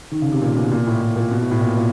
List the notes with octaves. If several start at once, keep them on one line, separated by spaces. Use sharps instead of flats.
D#3
C#3
C3
A#2
B2
A#2
A2
A2
A#2
B2
A2
A2
A#2
A#2